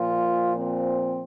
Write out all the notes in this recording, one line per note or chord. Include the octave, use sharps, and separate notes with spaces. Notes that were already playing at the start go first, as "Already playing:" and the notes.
Already playing: A#2 F3 F4
C4